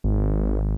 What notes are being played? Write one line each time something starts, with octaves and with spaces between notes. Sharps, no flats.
G#1